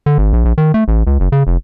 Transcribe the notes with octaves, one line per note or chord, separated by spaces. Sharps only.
D3
G#1
A#1
A#1
D#3
A3
A1
C#2
F#1
C#3
F1